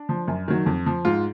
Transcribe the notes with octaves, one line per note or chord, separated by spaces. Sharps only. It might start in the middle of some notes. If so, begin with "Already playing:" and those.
Already playing: D4
F3
F#2
D#3 F#3
F2
F3
G#2 F4